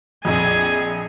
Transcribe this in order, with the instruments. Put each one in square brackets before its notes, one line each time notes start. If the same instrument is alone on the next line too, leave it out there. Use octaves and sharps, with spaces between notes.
[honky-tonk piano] A#1 F2 [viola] G#4 G#5